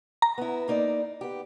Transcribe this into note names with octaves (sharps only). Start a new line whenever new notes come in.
A#5
B3 E4
A#3 D#4 D5
B3 G4